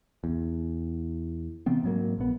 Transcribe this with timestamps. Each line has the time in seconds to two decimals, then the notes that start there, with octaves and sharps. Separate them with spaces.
0.24 E2
1.66 C3 E3 B3 C4
1.84 G#2 F#3 A#3
2.18 A#1 B3